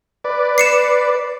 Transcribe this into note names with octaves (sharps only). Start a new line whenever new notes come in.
B4 D5
C7 C#7 E7